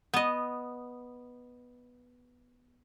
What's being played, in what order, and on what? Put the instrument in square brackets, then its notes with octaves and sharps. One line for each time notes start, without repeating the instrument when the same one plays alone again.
[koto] B3 D#5